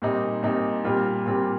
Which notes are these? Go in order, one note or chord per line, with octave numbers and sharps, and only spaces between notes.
A#2 G3 C4 D#4
A#2 G3 C4 D#4
A#2 G3 C4 F4
A#2 G3 C4 F4